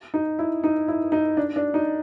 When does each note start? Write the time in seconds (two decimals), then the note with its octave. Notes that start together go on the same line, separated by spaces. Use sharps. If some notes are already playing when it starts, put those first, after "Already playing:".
0.14 D#4
0.39 E4
0.64 D#4
0.88 E4
1.12 D#4
1.37 D4
1.56 D4
1.74 D#4